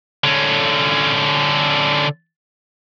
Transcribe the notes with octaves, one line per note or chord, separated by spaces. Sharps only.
D3 C#4